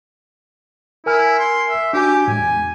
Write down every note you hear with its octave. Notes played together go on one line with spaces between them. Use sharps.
E4 A#4 G#5 F6
C6
E5
D4 F#4 G4 G#5
A2 G#3 G#5
E2